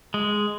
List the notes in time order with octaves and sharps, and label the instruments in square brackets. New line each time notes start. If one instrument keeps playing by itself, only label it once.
[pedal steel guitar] G#3